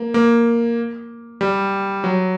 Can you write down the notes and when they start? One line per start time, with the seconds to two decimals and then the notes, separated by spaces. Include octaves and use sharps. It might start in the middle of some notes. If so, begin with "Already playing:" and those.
Already playing: A#3
0.14 A#3
1.41 G3
2.04 F#3